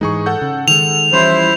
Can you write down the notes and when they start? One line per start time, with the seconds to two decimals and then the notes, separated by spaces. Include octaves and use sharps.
0.01 G#2 E3 G#3 D#4 G#4 C#6
0.26 A4 F#5 G6
0.42 C#3
0.68 D#3 G3 G#3 F7
1.13 E3 F3 G3 C#4 E4 C5 C6 E7